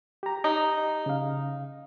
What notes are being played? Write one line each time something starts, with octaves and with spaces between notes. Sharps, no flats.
G4 A#5
D#4
C#3 F5